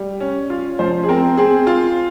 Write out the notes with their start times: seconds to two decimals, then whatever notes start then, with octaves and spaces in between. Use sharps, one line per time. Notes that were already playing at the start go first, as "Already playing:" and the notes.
Already playing: G3
0.20 C#4
0.50 F4
0.79 F3 C5
1.04 G#4
1.09 C4 A#4
1.37 C4 G#4
1.67 F4